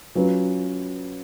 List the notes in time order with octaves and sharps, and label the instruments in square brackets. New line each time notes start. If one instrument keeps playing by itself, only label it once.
[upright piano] F#3 C#4 F4 B4